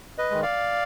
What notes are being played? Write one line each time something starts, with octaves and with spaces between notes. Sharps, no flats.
B4 D#5
D#3 G#3
D5 F5